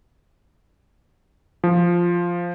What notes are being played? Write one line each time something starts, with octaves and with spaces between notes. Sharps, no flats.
F3